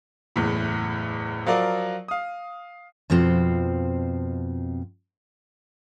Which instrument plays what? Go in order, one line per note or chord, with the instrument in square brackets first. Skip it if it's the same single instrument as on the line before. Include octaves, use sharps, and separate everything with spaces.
[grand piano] F#1 E2 A2
F3 F#3 F4 A#4 D5
F5 D#6
[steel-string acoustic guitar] F2 B2 F3 C4